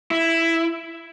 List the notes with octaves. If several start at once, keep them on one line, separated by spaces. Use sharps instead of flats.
E4